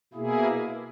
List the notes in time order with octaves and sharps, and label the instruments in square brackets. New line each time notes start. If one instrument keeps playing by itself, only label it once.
[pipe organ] B2 A#3 E4 G#4